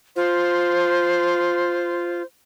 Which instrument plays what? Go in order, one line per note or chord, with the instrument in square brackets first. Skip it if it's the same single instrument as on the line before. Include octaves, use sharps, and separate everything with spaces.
[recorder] F4 [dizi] C5